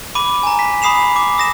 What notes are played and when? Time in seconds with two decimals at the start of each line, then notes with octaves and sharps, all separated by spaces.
0.15 B5 D6 D#7
0.43 G#5 A#5
0.59 B6
0.82 B5 D#6 C7 E7 F7
1.16 D6
1.38 D#6 A#6 E7